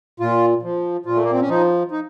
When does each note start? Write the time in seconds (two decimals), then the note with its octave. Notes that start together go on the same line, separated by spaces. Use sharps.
0.20 A#2 F4
0.63 F3
1.05 A#2 F4
1.15 A3
1.23 A#3
1.32 C4
1.41 C#4
1.49 F3 D#4
1.91 D#4